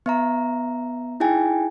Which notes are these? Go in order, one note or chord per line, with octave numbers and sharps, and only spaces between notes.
B3 E5 A#5
D#4 E4 G#4 G5 G#5